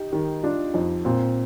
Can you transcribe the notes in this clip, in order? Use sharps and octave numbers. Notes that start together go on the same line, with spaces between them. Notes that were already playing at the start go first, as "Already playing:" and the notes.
Already playing: D#4 G4
D#3 G4
D4 F4
F2 D#4
A#2 C4